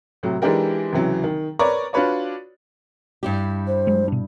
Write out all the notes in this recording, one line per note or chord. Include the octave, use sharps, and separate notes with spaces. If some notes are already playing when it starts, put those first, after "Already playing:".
A2 C3 F#3 A3
E3 G#3 D4 D#4 G4 A#4
C#2 C3 E3 F#3
D#3
A#4 B4 C#5 D5 A#5 C#6
D4 F4 F#4 B4 C#5 D5
G2 E4 G4
C5
F#3 G#3
B2 D4